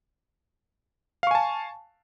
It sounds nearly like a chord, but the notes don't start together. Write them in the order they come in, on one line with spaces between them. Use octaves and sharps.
F5 C#6 G#5 A5